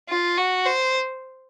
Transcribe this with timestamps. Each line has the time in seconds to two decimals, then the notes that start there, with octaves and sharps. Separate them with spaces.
0.09 F4
0.37 F#4
0.66 C5